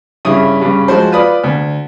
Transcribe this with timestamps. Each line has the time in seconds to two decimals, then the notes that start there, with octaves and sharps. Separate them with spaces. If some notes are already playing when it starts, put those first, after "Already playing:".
0.25 G2 C#3 E4 C#5 D#6
0.61 G2 C#3
0.88 F3 G#3 F#4 C5
1.12 F4 B4 D5 B5 D#6
1.43 D2